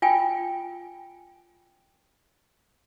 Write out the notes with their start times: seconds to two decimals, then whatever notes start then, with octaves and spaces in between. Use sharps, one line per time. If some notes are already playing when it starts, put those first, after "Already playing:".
0.02 F4 G5 G#5